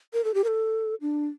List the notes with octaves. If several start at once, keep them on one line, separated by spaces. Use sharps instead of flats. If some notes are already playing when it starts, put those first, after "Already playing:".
A#4
A4
G4
A#4
A4
D4